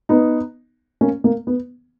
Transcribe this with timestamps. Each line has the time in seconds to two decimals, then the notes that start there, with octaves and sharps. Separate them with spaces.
0.09 B3 D#4
1.01 A#3 C#4
1.24 A#3
1.47 B3